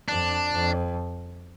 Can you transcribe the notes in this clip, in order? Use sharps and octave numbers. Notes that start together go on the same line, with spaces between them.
F2 D4
F2